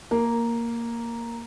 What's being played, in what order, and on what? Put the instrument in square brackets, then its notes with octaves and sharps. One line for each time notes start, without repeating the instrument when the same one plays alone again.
[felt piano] A#3